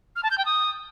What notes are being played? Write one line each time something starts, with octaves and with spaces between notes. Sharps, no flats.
F6
A5
G6
G5
D#6